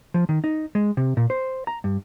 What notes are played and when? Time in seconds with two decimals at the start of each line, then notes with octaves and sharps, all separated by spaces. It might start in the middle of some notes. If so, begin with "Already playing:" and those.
0.14 F3
0.29 D#3
0.44 D#4
0.75 G#3
0.97 C3
1.17 A#2
1.30 C5
1.67 A#5
1.84 G2